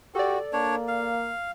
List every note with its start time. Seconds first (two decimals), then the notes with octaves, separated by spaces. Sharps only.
0.15 F#4 G4 A4 D5
0.53 A#3 D4 C#5
0.88 F5